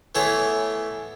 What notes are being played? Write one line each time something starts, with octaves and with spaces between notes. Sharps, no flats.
E3 A3 B3 E4 G#4 C#5